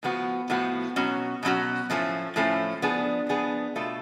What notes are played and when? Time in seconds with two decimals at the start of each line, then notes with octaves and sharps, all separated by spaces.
0.03 A2 F3 B3 F#4
0.50 A2 F3 B3 F#4
0.96 B2 F#3 C#4 F#4
1.43 B2 F#3 C#4 F#4
1.90 A2 F3 A3 C#4
2.36 A2 F3 A3 C#4
2.82 F3 B3 D4 G#4
3.29 F3 B3 D4 G#4
3.76 B2 A3 F4 A4